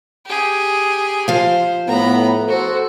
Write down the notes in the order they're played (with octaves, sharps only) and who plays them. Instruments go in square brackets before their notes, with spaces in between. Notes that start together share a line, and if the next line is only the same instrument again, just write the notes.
[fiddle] G4 G#4
[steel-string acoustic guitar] F3 F5 [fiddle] C5
[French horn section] A2 B3 [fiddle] A#5 B5
[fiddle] F#4 [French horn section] A4 C5